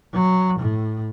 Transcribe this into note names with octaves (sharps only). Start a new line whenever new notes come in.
F#3
A2